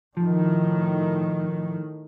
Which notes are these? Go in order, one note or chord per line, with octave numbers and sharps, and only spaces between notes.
A2 D#3 F3